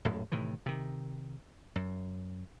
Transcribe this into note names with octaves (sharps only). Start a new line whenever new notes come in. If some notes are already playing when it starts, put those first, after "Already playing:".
D#1 G#1 F#2 A2
A2 C3 D#3 E3
C3 D#3
F#2